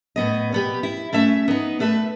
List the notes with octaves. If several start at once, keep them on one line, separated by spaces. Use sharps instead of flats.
A2 B3 D#5
B2 B3 G4
E4
A3 C#4 E5
B3 D#4
A3 B4 E5